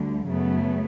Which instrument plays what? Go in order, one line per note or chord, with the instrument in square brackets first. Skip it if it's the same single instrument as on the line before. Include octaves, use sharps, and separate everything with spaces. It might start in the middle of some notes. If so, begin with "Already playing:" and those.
Already playing: [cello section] D2 D3 G3
F#2 C#3 F#3 A3 B3